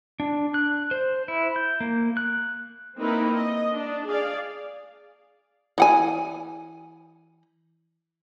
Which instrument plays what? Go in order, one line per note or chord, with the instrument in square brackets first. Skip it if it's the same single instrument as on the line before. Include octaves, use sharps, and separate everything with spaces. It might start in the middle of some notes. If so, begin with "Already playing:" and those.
[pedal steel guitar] D4
F#6
C5
E4
G6
A#3
F#6
[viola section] A#3 C4 D#4 E4 A#4 B4
D#5
D4
G#4 D5 F5
[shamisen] E3 F#5 G#5